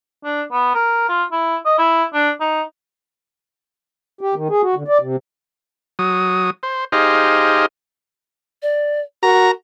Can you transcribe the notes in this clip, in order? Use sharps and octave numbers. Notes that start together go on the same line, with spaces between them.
D4
B3
A#4
F4
E4
D#5
E4
D4
D#4
G4
D#3
G#4
F#4
D3
D5
C3
F#3 D#6
C5
D#4 G4 G#4 C5 D#5 F5
D5
F#4 A#4 A#5